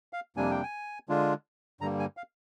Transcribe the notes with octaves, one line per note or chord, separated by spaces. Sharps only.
F5
F2 C3 G3 A#3 D4 G#5
G5
G#5
D3 G#3 D4 F4
G2 D3 G3 A#3 A#5
G#5
F5